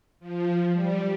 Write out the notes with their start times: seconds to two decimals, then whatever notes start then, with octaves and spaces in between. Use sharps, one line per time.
0.20 F3
0.72 G3